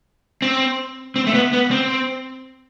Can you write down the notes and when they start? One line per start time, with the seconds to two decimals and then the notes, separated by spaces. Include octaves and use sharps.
0.42 C4
1.16 C4
1.27 A3
1.34 B3
1.53 B3
1.71 C4